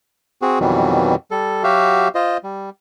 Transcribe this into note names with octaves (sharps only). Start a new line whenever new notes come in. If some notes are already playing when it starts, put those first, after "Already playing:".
C4 F#4 G#4
F2 B2 D#3 E3 F#3 G3
G3 A4
F#3 F#4 G4 E5 F5
F4 C5 D#5
G3